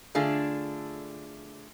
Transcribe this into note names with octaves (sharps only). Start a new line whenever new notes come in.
D3 A3 D4 F4 G#4